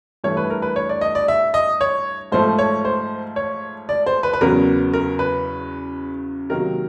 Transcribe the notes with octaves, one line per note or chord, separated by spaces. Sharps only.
G2 E3 A3 C#5
B4
A#4
B4
C#5
D5
D#5
D5
E5
D#5
C#5
G#2 F3 A3 C5
C#5
C5
C#5
D5
C5
B4
B4
E2 C#3 F#3 B3 A#4
A#4
B4
C3 D#3 F#3 A#3 A#4